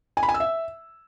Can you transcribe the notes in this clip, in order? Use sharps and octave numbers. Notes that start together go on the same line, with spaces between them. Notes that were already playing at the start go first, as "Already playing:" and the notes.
G#5
B5
G#5
E6
E5